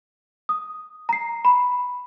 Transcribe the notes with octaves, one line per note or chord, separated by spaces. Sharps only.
D#6
A#5 C7
B5